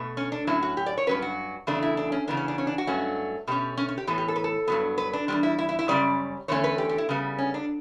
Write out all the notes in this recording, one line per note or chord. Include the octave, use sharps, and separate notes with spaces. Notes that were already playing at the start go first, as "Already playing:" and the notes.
Already playing: B2 A3
C#4
D4
A2 F#3 C#4 E4
F#4
G4
D5
C#5
G2 F#3 C#4 B4
F#4
E2 C#3 F#3 A3 D4
E4
D4
C#4
C#3 E3 B3 D4
C#4
D4
C#4
D4
F#4
G2 F#3 A3 C#4
B2 A3 C#4 G4
C#4
C#4
G4
A2 E3 B3 A4
G4
A4
B4
A4
G2 F#3 B3
B4
D4
E2 B2 G3 D4
E4
E4
E4
E4
F#2 C#3 G3 C#4 D5
E2 D3 A3 C#4 C#5
B4
G4
G4
E4
C#3 G3 B3
C#4
D4